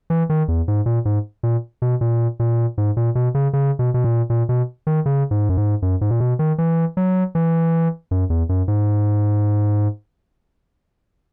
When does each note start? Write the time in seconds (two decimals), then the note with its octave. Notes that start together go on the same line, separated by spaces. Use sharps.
0.10 E3
0.30 D#3
0.48 E2
0.68 G#2
0.86 A#2
1.05 G#2
1.43 A#2
1.82 B2
2.01 A#2
2.40 A#2
2.78 G#2
2.97 A#2
3.15 B2
3.35 C#3
3.53 C#3
3.79 B2
3.94 B2
4.04 A#2
4.30 A#2
4.49 B2
4.87 D#3
5.06 C#3
5.31 G#2
5.49 F#2
5.57 G#2
5.82 F#2
6.01 G#2
6.11 A#2
6.20 B2
6.39 D#3
6.58 E3
6.97 F#3
7.35 E3
8.11 F#2
8.30 E2
8.49 F#2
8.68 G#2